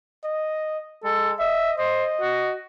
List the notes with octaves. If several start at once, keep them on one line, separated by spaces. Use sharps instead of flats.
D#5
G#3 A4
D#5 E5
C5 D#5
F#4